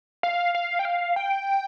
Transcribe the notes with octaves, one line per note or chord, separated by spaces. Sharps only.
F5
F5
G5
F5
G5